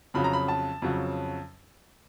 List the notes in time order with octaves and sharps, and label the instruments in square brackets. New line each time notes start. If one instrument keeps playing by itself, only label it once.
[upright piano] F2 C#3 F#3 B5
A#5
B5
A5
F2 C#3 F#3